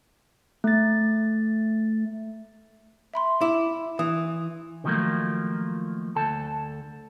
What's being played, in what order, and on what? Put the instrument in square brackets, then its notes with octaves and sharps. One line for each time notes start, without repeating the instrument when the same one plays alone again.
[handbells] A3 A6
[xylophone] E5 B5 C6
[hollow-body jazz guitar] E4 [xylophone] D6
[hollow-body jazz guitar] E3 [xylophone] D#6
[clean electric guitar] D3 D#3 F3 F#3 A3 A#3
D2 A4 A5